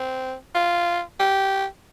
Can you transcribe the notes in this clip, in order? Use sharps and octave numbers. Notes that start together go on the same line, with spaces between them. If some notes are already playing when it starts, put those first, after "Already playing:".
Already playing: C4
F4
G4